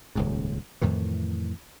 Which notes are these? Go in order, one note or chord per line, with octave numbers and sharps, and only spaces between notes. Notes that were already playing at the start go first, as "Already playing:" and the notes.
D#1 C#2 G#2
F2 A2 D#3 E3